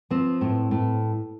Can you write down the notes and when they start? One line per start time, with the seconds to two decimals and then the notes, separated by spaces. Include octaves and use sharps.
0.10 F3 C4
0.41 A2
0.71 A2